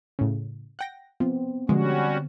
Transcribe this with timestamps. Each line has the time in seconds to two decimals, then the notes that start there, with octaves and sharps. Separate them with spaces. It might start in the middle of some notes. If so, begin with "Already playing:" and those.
0.19 A2 C#3
0.79 F#5 G5 A#6
1.20 F3 B3 C4
1.69 B2 D3 F3 G3 G#3 C#4 F#4